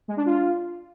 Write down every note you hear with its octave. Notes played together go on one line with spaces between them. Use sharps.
G#3
D4
F4